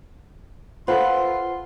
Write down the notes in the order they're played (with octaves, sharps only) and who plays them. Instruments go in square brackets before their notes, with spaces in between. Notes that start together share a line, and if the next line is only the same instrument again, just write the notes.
[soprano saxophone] F4 [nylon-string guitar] A4 B4 [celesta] C5 F#5 [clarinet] C6